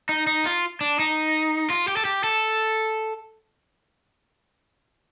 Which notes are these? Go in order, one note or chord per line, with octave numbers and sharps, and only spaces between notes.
D#4
D#4
F4
D4
D#4
F4
G4
A4
G4
A4